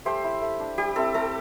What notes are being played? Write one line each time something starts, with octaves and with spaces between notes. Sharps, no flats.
A3 G4 C5
E4
A3
D4
G3 G4
C4 E4 A4
A3 A4